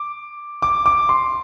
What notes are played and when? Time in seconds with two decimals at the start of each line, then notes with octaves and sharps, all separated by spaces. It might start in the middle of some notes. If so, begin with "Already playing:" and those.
Already playing: D6
0.62 D6
0.86 D6
1.09 C6